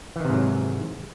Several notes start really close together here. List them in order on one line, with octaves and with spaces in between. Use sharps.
E3 D#3 C3 G#2 F#3